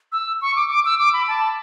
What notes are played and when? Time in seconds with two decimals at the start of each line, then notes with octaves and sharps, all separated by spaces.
0.12 E6
0.42 C#6
0.56 D6
0.70 D6
0.85 E6
0.99 D6
1.13 B5
1.28 A5